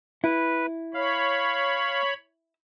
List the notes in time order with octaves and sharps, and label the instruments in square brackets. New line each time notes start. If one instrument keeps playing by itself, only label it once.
[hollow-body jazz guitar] E4 [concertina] B4
[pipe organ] C#5 B5 [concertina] F5